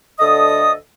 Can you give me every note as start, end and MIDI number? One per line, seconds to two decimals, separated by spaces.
0.19 0.72 38
0.19 0.72 50
0.19 0.72 69
0.19 0.72 75
0.19 0.72 87